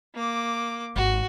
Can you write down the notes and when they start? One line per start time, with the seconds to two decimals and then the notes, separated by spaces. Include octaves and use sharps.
0.14 A#3 D6
0.96 G#1 F#4